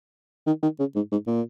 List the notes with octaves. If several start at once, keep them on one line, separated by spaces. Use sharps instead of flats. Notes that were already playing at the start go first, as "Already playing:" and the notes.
D#3
D#3
C#3
G#2
G#2
A#2